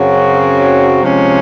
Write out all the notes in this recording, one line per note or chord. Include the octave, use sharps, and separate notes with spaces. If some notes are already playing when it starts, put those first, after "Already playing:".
Already playing: F#2 C#3 F#3 C4 F#4
C3 F3 G#3 C#4